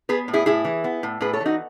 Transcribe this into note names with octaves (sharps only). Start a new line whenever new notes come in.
B3 G#4 B4
A2
E4 G#4
A2 E4 G#4
E3
B3
A2
A2 G#4 B4
A4 C#5
E3
D#4 F#4